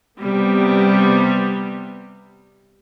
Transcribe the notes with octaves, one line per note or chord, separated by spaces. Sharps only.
C3 G3 B3